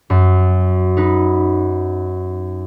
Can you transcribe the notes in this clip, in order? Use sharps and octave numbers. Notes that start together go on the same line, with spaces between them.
F#2
D#4 B4